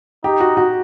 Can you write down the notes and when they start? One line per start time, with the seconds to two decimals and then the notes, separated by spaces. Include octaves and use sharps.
0.24 D#4 G4
0.40 F#4
0.57 F#4